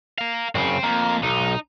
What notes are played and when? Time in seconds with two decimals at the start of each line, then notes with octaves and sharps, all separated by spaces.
0.18 A#4 F5
0.55 F#2 C#3 C4
0.84 F2 A#3
1.23 B1 D#4